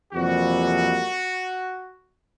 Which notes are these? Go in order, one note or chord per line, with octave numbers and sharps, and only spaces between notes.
F2 C3 E3 G3 A#3 F#4